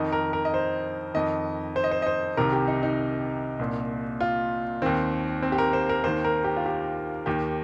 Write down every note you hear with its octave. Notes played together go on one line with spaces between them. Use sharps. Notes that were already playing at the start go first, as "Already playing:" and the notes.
Already playing: F2 D#3 D#5
A#4
A#4
D#5
C5
F2 D#3 D#5
C5
D#5
C5
D#5
C5
C2 C3 D#3 A#4
G4
D#4
D#4
C2 A#2
F4
D#2 D#3 C4
C4
G4
A#4
C5
A#4
D#2 D#3 C5
A#4
G4
F4
G4
D#2 D#3 G4